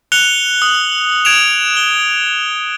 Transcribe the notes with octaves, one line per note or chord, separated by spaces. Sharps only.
F#6 C#7 F7 G7
D#6
G#6 D7 E7 F7
G7